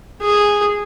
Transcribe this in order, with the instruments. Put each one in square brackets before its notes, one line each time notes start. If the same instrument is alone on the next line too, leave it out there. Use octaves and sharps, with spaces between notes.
[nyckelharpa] G#4